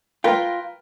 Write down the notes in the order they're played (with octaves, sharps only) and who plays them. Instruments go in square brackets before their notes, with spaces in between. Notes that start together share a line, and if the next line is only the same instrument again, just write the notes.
[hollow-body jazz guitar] F4 [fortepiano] A#4 B4 G5